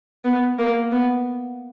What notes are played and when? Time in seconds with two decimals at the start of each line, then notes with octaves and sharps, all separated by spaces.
0.25 B3
0.58 A#3
0.92 B3